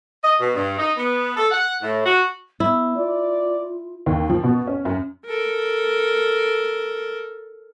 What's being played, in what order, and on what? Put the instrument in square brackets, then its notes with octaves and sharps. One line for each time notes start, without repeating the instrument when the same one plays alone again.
[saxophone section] D#5
B2
G2
D#4
B3
A4
F#5
A2
F#4
[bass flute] B3 [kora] E4
[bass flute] F4 [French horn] D5
[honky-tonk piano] D#2
F3
B2
C#4
F#2
[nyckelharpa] A4 A#4